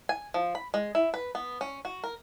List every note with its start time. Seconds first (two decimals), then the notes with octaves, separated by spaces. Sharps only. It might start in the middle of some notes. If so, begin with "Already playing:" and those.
0.09 G#5
0.34 F3
0.55 B5
0.74 G#3
0.95 E4
1.14 B4
1.35 B3
1.61 C#4
1.85 F#4
2.04 A#4